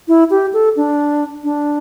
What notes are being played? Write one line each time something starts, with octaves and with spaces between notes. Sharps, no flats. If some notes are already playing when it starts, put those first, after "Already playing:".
E4
G4
A4
D4
D4